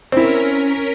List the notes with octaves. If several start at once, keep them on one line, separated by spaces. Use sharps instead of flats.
C4 C#4 E4 A#4 B6